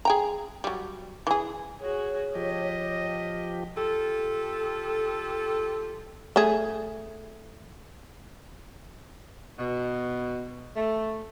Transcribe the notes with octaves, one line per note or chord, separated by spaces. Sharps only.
G#4 G5 A#5
F#3 G3
E3 G#4
F#4 G#4 C#5
F3 G4 D#5
F4 G4 A4
A3 G#4
B2
A3